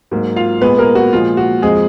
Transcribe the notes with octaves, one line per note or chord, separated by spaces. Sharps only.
G#2 F#3 A#3
F4 F5
A#2 G#3 B3 B4
A#3 A#4
F#4
A#2 F3 G#3 F4
F#4
F2 F3 G#3 G#4